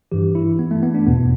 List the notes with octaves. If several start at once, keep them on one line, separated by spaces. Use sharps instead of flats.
G2 E3 G4
E4
B3
A3
B3
D4
E2 B2 B3